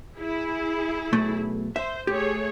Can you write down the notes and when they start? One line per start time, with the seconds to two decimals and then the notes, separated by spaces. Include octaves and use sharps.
0.15 E4 G#4
1.13 B1 A3
1.76 C5 E5
2.07 A3 G4 G#4 C#5